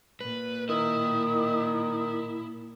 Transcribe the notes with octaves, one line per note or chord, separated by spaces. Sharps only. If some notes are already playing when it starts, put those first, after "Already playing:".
A#2 B4
D#3 E4 D#6